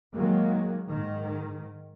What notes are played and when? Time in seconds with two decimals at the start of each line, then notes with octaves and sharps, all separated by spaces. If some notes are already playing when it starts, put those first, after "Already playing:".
0.13 D#3 F#3 G#3 A#3
0.88 G#2 D#3